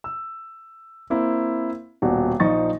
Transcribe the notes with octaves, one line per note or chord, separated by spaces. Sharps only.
E6
A#3 C4 E4
D#1 B2 F#4 D5
A#1 A#2 F3 D#4 C#6 A6